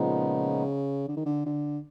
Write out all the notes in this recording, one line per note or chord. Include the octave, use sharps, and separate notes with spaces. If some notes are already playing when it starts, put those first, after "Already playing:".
Already playing: A#2 C#3 F3 G#3 B3 D#4
D3
D#3
D3
D3